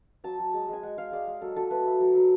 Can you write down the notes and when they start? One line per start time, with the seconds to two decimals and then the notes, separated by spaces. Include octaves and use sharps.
0.24 F#3 A5
0.39 F#3
0.54 G#3
0.68 G#3 G#5
0.83 G#3 F#5
0.97 G#3 F5
1.12 G#3 D5
1.27 G#3
1.41 F#3 A4
1.56 F#3 A4
1.71 A3 B4
1.86 A3
2.00 F#3
2.15 F#3